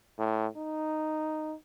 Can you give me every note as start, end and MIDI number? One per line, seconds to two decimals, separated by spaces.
0.18 0.47 45
0.57 1.55 63